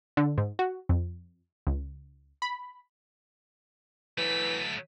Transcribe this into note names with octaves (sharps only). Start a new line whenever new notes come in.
D3
G#2
F#4
F2
C#2
B5
E3 F#3 A3 B6